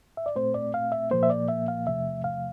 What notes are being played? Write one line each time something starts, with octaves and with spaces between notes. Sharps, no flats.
E5
D5
A#2 A3 C4 C5
D5
F5
E5
A#2 F3 A#3 C5
E5
D5
E5
F5
E2 C3 F3 A3 E5
F5